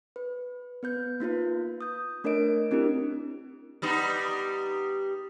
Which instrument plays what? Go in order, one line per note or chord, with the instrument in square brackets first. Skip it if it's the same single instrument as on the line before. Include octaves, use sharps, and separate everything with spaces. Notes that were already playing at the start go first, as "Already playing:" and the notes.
[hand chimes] B4
B3 B4 G6
A#3 D#4 F4 B4
D#6 G6
A3 D4 A#4 C#5 D#5 D7
C4 D4 E4 G4 A#4
[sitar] G3 B3 D#4